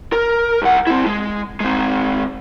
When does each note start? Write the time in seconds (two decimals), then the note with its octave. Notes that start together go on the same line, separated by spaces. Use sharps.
0.12 A#4
0.62 C2 F#5
0.87 C4 E4
1.06 G#3
1.60 G#3 C4